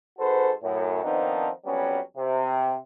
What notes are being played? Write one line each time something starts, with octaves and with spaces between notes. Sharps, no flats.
G#2 F#4 A4 B4 C5
F#2 A2
D#3 F3 B3 C4 D4 D#4
F2 F#3 G3 B3 C#4
C3